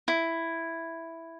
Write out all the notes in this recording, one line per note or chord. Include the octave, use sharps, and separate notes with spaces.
E4